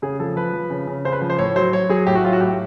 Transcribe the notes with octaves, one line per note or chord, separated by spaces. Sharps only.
C#3 G#4
F3 A4
F3 B4
F3
C#3
C#3
C#3 C5
B4
F3
C5
A2 C#5
F#3 C5
F#3 C#5
F#3 G#4
A2 G4
F#4
F#3 F4
F#4
A2 G4